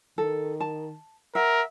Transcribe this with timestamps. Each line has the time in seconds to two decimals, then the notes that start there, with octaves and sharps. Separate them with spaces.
0.18 D#3 A4
0.60 A5
1.35 A#4 E5 F#5